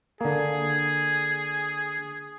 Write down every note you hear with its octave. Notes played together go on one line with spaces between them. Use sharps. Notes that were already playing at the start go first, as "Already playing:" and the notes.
D3 A#3 G#4